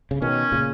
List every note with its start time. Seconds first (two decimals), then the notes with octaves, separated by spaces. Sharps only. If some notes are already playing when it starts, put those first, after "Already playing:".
0.11 C#3
0.22 B2 D#3 C#4
0.52 A#2 C#3